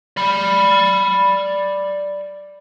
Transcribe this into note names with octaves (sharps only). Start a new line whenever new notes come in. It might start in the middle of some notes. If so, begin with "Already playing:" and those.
D5 B5